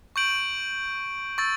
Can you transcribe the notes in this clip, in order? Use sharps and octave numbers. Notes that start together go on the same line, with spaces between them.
C#6 G6 D7 F#7
C#6 E6 A6